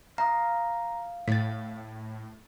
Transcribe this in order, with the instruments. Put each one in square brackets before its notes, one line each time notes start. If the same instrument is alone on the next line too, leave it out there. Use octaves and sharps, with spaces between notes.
[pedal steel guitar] F5 D#6 [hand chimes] A#5
[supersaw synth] A2 [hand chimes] A6 B6